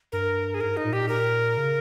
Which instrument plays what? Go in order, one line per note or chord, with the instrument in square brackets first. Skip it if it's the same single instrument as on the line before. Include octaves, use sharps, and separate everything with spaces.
[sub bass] G2 [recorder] A#4
[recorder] G#4
[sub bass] G#2 [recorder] A#4
[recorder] D#4
[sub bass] A#2
[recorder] G4
A#4
[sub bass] C#3